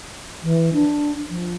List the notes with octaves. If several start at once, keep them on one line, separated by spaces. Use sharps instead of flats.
E3
D4
F3